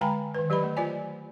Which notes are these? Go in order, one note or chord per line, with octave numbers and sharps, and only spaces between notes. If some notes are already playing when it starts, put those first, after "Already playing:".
D3 G#3 G5 G#5 A#5 B5
D#3 B4
F#3 G4 B4 D#5 B5
A3
F4 C5 D5 G#5